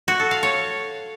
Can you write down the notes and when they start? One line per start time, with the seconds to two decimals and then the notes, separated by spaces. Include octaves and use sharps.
0.08 F#4
0.19 A4
0.31 F5
0.43 C#5